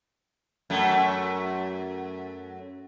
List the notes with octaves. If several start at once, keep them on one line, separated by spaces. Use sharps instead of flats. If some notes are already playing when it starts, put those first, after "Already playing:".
F#2 A3